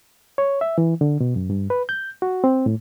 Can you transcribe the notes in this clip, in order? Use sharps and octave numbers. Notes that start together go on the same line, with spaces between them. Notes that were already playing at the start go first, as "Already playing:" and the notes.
C#5
E5
E3
D3
B2
F#2
G2
B4
G6
F#4
C4
A2